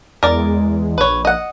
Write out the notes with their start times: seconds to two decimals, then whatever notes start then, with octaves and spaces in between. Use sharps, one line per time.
0.23 E2 G#3 A#4 D5
0.98 A#1 B4 C#5
1.25 D#5 F#5